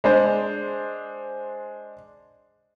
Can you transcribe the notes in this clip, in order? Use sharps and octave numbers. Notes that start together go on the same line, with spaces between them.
G#3 D4 C5